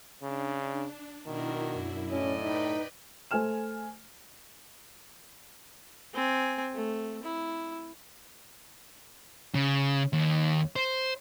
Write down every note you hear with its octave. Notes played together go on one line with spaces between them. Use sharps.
C#3 D4
B2 D#3 D4 E4 F#4 A#4
F#2 E4
A2 C#4 D5 D#5
D#4 B4 G5 B5
A3 C5 G#5 F6 E7
C4 G#5
A3
E4
C#3
D#2
C5